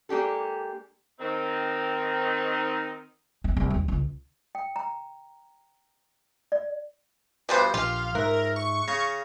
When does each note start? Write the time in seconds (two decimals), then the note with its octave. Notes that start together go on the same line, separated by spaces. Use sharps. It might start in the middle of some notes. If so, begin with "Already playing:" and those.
0.09 G#3 A#3 D4 G4 A4
1.20 D#3 C4 D#4
3.44 C4
3.57 C2
3.70 D#2
3.88 C#2
4.55 G5
4.76 A#5
6.52 D5
7.49 G2 B2 F3 G3 D4 C5
7.74 A#1 F4 G4 F5
8.15 G#2 A#4 E5 F#6
8.56 C#6
8.88 C#3 F5 A#6